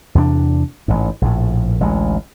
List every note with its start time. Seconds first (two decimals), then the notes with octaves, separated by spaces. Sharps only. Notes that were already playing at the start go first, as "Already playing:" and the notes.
0.15 E2 C3 B3 D4
0.88 A1 G#2
1.22 A#1 A2
1.80 A1 D2 G#3